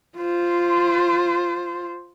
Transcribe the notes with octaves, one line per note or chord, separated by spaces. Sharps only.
F4 C5